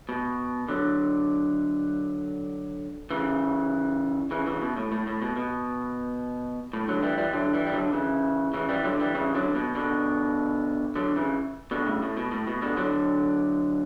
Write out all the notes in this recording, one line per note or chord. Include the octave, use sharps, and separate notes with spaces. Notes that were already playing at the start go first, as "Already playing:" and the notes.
B2
D3 F#3
C#3 E3
C#3 E3
C#3 E3
B2
A2
A2
A2
B2
B2
A2
D3 F#3
E3 G3
E3 G3
D3 F#3
E3 G3
G3
D3 F#3
C#3 E3
C#3 E3
E3 G3
D3 F#3
E3 G3
C#3 E3
D3 F#3
B2
B2 D3
D3 F#3
C#3 E3
B2 D3
A2 C#3
A2
B2
A2
B2
B2 D3
D3 F#3